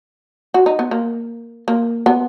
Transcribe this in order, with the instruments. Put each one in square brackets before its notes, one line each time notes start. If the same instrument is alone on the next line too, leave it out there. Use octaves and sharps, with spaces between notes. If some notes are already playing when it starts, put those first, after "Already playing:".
[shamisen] F#4
D#4
B3
A#3
A#3
B3